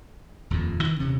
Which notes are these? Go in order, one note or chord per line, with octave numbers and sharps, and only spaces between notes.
D#1 F2 A#2
D#3 E3
D#1 C3 C#4